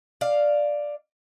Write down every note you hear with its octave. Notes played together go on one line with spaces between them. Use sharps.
D5 F5